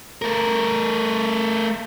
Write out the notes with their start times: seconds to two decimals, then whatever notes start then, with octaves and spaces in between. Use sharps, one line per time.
0.22 A3 A#4